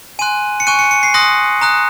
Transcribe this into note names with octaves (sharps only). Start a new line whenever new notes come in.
G#5 C6 F#6 D#7
C#7
G#5 C#6 F#6 D#7
C#7
C#7
C7
C6 D#6 F#6 A#6
A#5 D#6 F#6